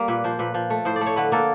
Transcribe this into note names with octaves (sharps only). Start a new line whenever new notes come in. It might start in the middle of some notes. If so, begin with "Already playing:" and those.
Already playing: G3 A#3
A#2 B4
F3 C5
A#2 B4
F3
A3
A2 C5
D5
A3
C#5
D3 B4
A#3 A4